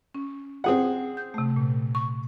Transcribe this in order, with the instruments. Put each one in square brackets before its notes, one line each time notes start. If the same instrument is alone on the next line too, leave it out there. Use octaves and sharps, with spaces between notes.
[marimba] C#4
[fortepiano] C4 G#4 F#5
[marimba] G6
C3 A3
A#2
C#6